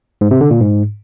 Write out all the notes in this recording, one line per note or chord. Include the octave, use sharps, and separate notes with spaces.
G#2
C3
D3
A#2
G#2